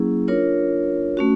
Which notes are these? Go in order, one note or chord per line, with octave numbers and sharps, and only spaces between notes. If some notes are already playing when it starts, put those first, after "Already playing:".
Already playing: F#3 A#3 C#4 E4 G#4
D4 F4 A#4 C#5
A3 C#4 F#4